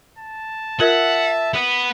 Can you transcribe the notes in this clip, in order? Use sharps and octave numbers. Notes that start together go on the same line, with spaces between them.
A5
F4 A#4 E5 F#5
B3 B5